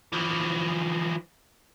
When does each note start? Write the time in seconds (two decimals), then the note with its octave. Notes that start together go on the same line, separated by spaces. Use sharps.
0.13 E3 F3